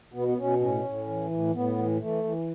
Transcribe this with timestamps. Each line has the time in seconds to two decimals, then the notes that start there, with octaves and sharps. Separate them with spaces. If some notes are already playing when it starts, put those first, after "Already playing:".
0.14 B2 B3
0.28 B3
0.38 B2 C#4
0.61 A2 C#4
0.84 A2
1.07 E3
1.30 A2
1.54 A2 B3
1.78 E3
2.00 E3 A3
2.24 E3